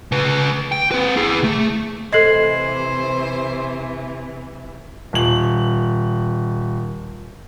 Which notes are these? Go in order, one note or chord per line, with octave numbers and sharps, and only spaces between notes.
C#3 B4
G5
C4 B4
E4 G#4
A3
C3 E3 A4 C5 D#5 G#6 C7 F#7
D#1 F#7